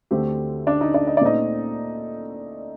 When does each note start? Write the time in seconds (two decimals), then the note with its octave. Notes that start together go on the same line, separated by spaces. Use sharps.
0.11 D2 D3 A3 C4 G4
0.67 D4 D5
0.81 D#4 D#5
0.94 D4 D5
1.07 D#5
1.17 D5
1.21 A#2 A3 C4 D#4 D#5